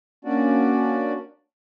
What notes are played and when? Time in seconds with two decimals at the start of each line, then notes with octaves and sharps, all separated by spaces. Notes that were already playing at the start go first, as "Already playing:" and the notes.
0.25 A#3 C#4 D4 F#4 D5